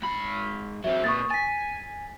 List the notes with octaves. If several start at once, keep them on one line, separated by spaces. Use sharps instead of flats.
G#2 B5
F#3 C4 E5
A#2 B4 C#6 D#6 A6
G#5 A6 B6